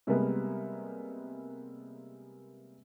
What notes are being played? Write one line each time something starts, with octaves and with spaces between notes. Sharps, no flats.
C3 G3 G#3 A#3 B3